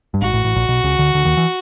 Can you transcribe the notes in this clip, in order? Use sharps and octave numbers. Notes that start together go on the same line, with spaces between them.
G2
G#1 G#2 F#4
A1 A2
A1 A2
A#1 A#2
B1 B2
C#2 C#3
D2 D3
D2 D3
D#2 D#3
E3